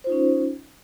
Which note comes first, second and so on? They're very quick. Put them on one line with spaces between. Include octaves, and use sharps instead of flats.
C5 F4 D#4 C#4